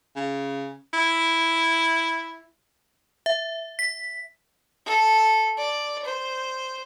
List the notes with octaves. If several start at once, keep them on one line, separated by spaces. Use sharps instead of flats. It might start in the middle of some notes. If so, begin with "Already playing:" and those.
C#3
E4
E5
B6
A4
D5
C5